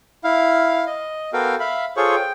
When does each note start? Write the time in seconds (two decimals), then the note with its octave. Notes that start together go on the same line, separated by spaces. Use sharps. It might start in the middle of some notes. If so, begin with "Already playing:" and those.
0.24 E4 F5
0.87 D#5
1.33 B3 F#4 A4 A#4 F5 G5
1.60 E5 F5 B5
1.97 F4 G#4 A4 C5 C#5 C#6
2.15 G5